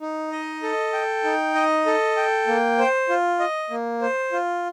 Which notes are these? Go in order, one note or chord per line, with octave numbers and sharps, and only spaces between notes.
D#4
D#5
A4
G5
D#4
D#5
A4
G5
A#3
C5
F4
D#5
A#3
C5
F4